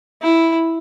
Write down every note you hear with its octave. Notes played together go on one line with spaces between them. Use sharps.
E4